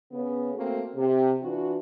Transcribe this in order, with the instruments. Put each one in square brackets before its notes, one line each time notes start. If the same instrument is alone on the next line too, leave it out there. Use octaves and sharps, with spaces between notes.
[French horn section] C#3 B3
A3 A#3 C4 F#4 A4
C3
E3 D4 F4 F#4